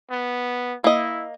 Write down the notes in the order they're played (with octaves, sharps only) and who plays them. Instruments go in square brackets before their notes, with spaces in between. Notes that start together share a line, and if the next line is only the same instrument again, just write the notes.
[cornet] B3
[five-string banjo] A#3 D#5 [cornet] E4